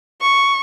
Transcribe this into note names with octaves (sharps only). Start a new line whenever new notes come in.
C#6